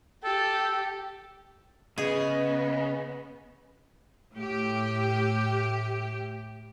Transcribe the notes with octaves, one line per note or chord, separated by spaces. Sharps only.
G4 A4
C#3 B3 G#4 D#5
A2 G4